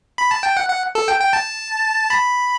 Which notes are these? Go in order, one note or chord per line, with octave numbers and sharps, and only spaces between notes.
B5
A5
G5
F#5
F#5
A4
G5
G5
A5
B5